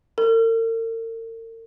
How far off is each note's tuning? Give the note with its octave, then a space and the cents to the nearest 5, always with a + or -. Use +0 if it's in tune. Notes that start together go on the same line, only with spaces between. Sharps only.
A#4 -45